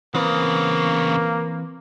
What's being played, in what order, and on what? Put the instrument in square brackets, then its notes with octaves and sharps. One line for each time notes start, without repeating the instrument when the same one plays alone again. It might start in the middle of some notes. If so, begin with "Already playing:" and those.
[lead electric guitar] E2 C#3 [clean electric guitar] E3 C4 B4 [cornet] A#3